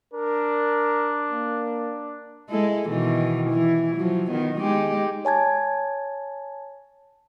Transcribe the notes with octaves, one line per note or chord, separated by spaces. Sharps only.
D4 A#4
A#3
G#3 E4 A4
B2 D#3 E3
E3 E4
F3 F#3
D#3 B3
G#3 D#4 G4
C#5 G#5 A5 G#6